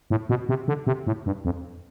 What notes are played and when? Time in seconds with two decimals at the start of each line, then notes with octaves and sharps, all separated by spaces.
0.10 A2
0.29 B2
0.49 C3
0.68 D3
0.87 C3
1.07 A2
1.26 G2
1.45 F2